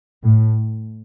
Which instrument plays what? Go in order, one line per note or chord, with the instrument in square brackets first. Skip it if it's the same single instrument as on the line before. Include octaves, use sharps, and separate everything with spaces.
[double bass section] A2